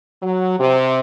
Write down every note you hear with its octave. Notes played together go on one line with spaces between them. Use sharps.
F#3
C3